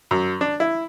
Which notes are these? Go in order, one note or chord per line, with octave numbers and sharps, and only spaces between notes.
F#2
D4
E4